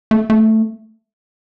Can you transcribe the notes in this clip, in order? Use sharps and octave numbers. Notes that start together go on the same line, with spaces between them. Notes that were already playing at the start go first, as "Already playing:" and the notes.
A3
A3